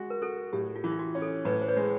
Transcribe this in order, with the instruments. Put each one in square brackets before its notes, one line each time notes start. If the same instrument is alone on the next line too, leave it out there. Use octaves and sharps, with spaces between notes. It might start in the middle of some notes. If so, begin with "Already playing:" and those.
Already playing: [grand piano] G#3 F#4
[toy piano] A#4
[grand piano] F#4 [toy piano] A4
[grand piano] A2 [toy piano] G4
[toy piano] F4
[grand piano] E3
[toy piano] F4
F#4
[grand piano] C#4
[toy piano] A4
[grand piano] A2 [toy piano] B4
[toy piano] C5
B4 C#5
[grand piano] G#3